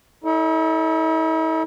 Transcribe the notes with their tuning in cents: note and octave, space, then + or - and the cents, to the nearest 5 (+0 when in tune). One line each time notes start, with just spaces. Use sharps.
E4 -45 A4 +0 D5 +0